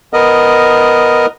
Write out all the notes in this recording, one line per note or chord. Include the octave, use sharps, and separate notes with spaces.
B3 A#4 D#5